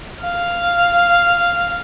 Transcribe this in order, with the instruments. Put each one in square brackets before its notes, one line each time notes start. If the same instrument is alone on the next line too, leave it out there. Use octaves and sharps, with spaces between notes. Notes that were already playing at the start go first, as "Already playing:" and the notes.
[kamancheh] F5